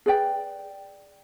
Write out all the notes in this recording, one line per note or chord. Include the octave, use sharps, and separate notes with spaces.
G#4 B4 D5 G5